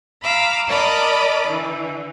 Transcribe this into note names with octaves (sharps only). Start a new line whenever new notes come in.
F5 A#5 B5 D6 E6
A#4 D5 D#5 A5 B5 D6
D3 E3